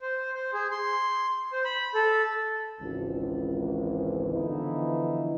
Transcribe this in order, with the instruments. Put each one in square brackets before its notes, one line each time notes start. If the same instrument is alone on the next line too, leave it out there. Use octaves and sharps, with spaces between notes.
[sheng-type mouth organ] C5
C5
G#4
C6
C5
B5
A4
[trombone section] G#1 C#2 E3
D3 E3 F3 B3 D#4 E4